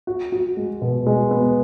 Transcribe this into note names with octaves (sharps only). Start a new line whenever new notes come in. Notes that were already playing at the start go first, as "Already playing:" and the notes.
F#4
F#4
G#3
B2
G#3
B3